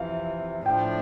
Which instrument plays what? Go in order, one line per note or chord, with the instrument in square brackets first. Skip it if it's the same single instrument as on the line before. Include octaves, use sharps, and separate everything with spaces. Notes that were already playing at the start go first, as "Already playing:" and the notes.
Already playing: [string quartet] F2 C3 E3 [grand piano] F5
[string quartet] A2 F3 A3 D4 [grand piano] G5